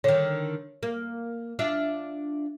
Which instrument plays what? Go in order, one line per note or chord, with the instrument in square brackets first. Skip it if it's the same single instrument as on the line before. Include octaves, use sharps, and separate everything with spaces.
[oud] D3 D#3 [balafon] C#5
[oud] A#3
D4 F4 E5